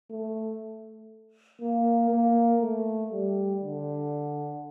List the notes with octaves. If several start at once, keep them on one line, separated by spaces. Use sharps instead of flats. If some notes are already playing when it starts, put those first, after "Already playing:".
A3
A#3
A#3
A3
G3
D3